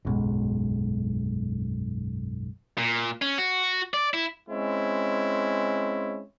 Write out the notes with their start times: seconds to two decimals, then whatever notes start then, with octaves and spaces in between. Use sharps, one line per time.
0.05 F#1 B1 G#2
2.78 A#2
3.22 C#4
3.38 F#4
3.94 D5
4.14 E4
4.50 G#3 C4 C#4 E4